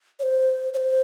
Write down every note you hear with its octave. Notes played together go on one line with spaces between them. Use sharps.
C#5
C5
C#5
C5